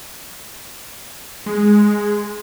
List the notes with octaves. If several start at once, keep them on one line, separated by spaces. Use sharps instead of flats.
G#3